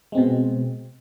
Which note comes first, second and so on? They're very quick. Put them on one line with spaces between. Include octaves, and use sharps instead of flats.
G#3 C4 B2